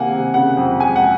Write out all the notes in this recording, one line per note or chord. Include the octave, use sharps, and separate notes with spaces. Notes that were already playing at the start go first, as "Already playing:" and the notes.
Already playing: C3 D#3 A#3 F#5 G#5
C3
C#3 F#5
F2
G#3 G#5
F#5